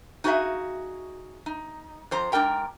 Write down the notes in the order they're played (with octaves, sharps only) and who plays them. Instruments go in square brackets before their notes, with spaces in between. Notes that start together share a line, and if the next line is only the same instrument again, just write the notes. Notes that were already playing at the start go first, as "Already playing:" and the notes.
[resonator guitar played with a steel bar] D#4 F#4 G#4 A#4 E5 F5
D#4
F2 C5 A#5
G#2 D4 A#4 G5 A#5